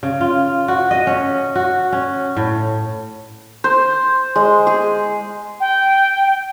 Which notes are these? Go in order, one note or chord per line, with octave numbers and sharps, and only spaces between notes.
C#3
F4
F#4
D#5
C#4
F#4
C#4
A2
C5
G#3
G#4
G5